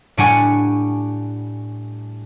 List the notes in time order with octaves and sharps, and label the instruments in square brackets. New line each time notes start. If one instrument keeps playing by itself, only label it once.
[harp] A2 G3 D4 F#5 G#5 C#6